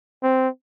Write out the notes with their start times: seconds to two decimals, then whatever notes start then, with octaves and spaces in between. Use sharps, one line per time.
0.23 C4